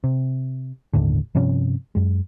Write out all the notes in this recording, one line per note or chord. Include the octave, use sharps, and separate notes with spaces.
C3
G1 D#2 A2 D3
G2 C3 F3 C#4
F#2 G#3